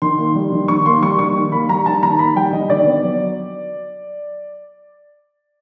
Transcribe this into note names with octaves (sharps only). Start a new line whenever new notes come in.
D#3 C6
A#3
G3
D#3
D#3 C#6
A#3 C6
G3 C#6
D#3 C#6
D#3
A#3 B5
G3 A#5
D#3 A5
D#3 A#5
A#3 B5
G3 G5
D#3 D#5
D3 D5
B3
F#3